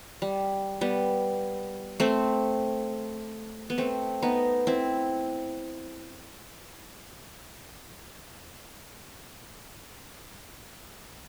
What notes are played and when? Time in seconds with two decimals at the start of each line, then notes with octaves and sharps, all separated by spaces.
0.22 G3
0.81 G3 B3
2.00 A3 C4
3.70 B3
3.78 A3 C4
4.22 B3 D#4
4.67 C4 E4